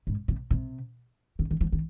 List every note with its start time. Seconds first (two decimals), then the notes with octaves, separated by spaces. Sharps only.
0.07 G#2
0.28 C3
0.51 C3
1.39 D3
1.51 D#3
1.61 F3
1.72 D#3